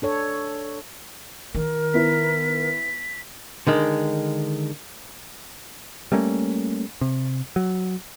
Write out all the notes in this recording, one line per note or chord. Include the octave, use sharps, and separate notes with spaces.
D4 A4 C#5
D#3 A#4
B3 E4 B6
D3 D#3 G#3
G3 A3 A#3 C#4
C3
F#3